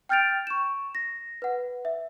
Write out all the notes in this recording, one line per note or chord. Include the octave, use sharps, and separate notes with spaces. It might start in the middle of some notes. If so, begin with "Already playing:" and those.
G5 F6 G6 A6 D7 F7
C#6 E7
A#6
B4 F#5
E5